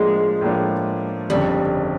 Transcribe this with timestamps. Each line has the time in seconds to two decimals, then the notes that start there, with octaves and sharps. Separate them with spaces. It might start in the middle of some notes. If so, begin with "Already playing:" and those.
Already playing: A2 F3 G#3 A#3 D4 F4
0.41 A2 F3 A#3 D4 F4
1.30 G1 F2 C#3 G3